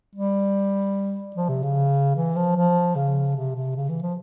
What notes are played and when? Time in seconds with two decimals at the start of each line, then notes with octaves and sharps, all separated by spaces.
0.15 G3
1.36 F3
1.49 C3
1.63 C#3
2.16 E3
2.36 F3
2.56 F3
2.96 C#3
3.36 C3
3.56 C3
3.76 C#3
3.89 E3
4.02 F3